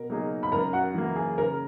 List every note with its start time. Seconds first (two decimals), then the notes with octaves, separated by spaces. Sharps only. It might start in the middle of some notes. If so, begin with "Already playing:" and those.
Already playing: B2 A#4
0.10 F#3 A#3 D#4 G#4
0.43 B5
0.52 F#2 A#4 A#5
0.73 F#4 F#5
0.94 E3 A#3
1.16 G#4
1.37 C#3 A#4